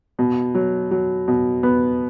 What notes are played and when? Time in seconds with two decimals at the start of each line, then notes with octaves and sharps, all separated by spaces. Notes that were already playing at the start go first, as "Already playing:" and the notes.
0.19 B2
0.55 F#3
0.91 F#3
1.28 B2
1.63 B3